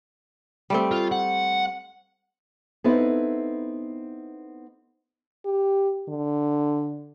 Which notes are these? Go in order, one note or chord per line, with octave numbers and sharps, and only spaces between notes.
G3 A3 C4
F4
F#5
B3 C4 D#4 E4 A4 B4
G4
D3